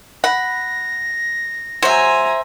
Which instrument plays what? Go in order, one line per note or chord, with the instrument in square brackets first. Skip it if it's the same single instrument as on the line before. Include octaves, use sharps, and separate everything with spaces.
[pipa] F#5 [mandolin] B5 [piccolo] A#6
[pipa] F#3 [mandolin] C5 E5 [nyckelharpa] G#5 A#5